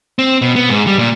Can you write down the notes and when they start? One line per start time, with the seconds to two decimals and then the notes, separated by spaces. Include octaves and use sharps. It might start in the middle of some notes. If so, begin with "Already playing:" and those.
0.19 C4
0.42 B2
0.56 B3
0.69 G#2
0.87 G3
0.99 A#2